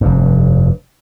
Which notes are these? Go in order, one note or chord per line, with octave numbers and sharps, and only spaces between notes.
F1 G2